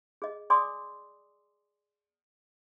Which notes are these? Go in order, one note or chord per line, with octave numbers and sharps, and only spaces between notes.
G#4 D#5
G#4 D5 G#5 C6 D6 D#6